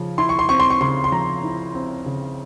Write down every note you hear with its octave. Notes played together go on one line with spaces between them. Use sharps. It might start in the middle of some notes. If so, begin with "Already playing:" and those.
Already playing: C#3 F3
E4 C6
C#6
C6
C4 C#6
C6
C#6
C#3 C6
C6
F3 A#5
E4
C4
C#3